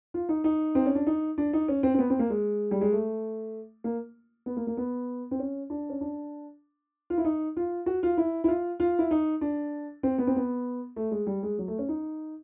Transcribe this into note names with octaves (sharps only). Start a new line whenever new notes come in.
F4
D#4
D#4
C4
C#4
D4
D#4
D4
D#4
C#4
C4
C4
B3
C4
A#3
G#3
G3
G#3
A3
A#3
B3
A#3
A#3
B3
C4
C#4
D4
C#4
D4
F4
E4
D#4
F4
F#4
F4
E4
E4
F4
F4
E4
D#4
D4
C4
B3
C4
B3
A3
G#3
G3
G#3
F#3
A3
C#4
D#4